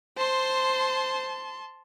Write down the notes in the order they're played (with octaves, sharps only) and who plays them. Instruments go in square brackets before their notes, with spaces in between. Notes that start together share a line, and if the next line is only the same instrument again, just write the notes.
[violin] C5 [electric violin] A5 C6